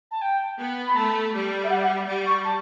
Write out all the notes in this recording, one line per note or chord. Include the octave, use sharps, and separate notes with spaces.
A5
G5
B3
B5
A3 A5
G3
E5
F#5
F#5
G3
C#6
A5